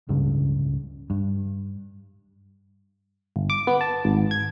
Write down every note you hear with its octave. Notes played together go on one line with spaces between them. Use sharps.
D1 C#2 G2 C#3
G2
G1
D6
B3
A5
G#1
G#6